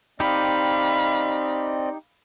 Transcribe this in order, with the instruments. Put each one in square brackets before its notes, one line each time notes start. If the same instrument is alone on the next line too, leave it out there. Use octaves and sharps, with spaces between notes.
[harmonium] C4 D5 D#5 [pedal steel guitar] D#4 G4 [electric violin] F5 B5